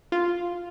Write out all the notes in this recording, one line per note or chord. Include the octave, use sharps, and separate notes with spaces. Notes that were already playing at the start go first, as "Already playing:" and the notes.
F4